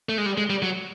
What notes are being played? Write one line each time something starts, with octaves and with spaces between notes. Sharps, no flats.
A3
G#3
G3
G#3
G3
F#3